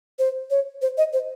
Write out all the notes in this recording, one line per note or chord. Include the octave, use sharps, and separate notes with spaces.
C5
C#5
C5
D#5
C5